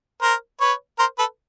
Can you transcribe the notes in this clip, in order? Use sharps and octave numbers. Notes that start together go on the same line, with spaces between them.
A#4 C5
B4 C#5
A#4 C5
A4 B4